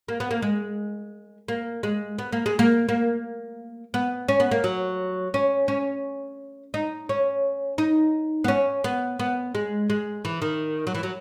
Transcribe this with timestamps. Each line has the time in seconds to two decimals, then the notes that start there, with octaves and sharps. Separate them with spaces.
0.08 A#3
0.20 B3
0.31 A#3
0.42 G#3
1.48 A#3
1.83 G#3
2.19 B3
2.33 A#3
2.46 G#3
2.59 A#3
2.89 A#3
3.94 B3
4.28 C#4
4.40 B3
4.51 A#3
4.64 F#3
5.34 C#4
5.68 C#4
6.74 D#4
7.09 C#4
7.78 D#4
8.44 B3
8.48 C#4
8.84 B3
9.19 B3
9.55 G#3
9.90 G#3
10.25 E3
10.42 D#3
10.87 F#3
10.94 E3
11.03 F#3